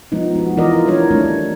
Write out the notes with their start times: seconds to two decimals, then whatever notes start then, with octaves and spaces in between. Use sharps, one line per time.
0.12 F3 G#3 B3 D#4
0.35 B3 F#4
0.57 E3 F4 A#4 D5 D#5
0.86 G3 D4 E4 A#4 C#5
1.10 D#3 A3 C4 D4 C#5